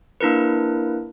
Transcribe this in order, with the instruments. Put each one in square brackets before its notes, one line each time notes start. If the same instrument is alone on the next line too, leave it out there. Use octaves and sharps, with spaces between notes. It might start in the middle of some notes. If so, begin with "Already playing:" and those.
[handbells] A#3 D4 E4 A#4 B4